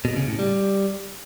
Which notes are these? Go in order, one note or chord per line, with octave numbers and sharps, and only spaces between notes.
B2
C#3
A2
G3